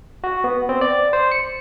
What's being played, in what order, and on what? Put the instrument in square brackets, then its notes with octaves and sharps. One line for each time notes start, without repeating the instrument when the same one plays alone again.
[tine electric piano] F#4
B3
C4
D5
C5
C#7